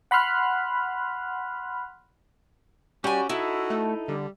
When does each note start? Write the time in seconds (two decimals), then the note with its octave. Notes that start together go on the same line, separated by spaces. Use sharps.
0.11 F#5 B5 C6 F6 F#6
3.04 G3 C#4 F#4 G4 G#5
3.29 D#4 E4 F#4 A4
3.70 A3
4.08 D3 G3